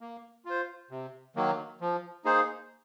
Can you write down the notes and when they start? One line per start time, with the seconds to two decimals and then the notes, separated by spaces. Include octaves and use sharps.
0.01 A#3
0.45 F4 C5
0.91 C3
1.36 D#3 F#3 A#3
1.81 F3
2.25 A#3 D#4 G#4 C5